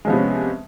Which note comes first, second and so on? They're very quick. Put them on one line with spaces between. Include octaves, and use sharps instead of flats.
G#3 F3 B3 C3 C#4